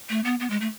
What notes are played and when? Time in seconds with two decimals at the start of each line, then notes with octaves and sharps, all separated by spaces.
0.10 A3
0.24 B3
0.40 B3
0.50 G#3
0.61 A3